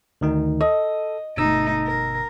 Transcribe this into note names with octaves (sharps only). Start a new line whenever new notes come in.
D2 D#3 D#4
A4 D#5
G1 B2 A3 D#4 E6
A#4